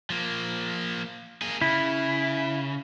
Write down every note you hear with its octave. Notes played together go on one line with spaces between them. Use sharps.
F3 A#3
A#3 G#4
C#3 E4